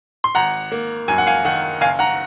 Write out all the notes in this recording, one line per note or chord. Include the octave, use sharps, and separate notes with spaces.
C6
G#1 F#5 A#5
A#3
F#2 G#5
F#5
F5 G#5
D#3 F#5
F#1 F5 G#5
F#5 A#5